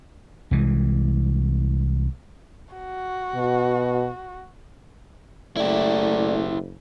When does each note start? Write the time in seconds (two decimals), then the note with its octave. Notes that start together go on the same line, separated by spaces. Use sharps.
0.51 C2 E3 G#3
2.75 F#4
3.35 B2
5.57 F#1 A3 E4 G4 D5